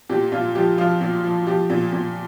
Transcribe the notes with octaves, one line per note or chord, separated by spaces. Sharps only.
A#2 G4
A#2 F4
F3 G4
F3 F4
A#2
F3
F3 G4
A#2
A#2